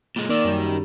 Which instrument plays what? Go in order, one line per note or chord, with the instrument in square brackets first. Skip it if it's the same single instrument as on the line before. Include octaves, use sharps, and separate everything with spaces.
[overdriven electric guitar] A#2 G#3
[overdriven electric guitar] D#3 [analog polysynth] A#3 D5 E6
[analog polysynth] F#2 G3